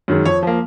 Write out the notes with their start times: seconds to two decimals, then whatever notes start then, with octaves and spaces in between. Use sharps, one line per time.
0.08 F#2 D#3 G#3
0.25 F2 C#5
0.43 F3 A#3